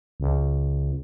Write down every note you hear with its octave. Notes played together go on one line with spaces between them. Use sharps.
C#2